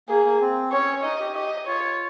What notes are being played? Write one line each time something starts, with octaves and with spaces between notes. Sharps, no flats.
A#3 G#4
A#3
C4
C#4 C#5
D#4 D#5
G4
G4 D#5
F4 C#5